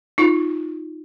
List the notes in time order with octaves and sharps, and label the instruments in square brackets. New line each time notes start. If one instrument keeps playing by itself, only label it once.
[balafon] D#4 F4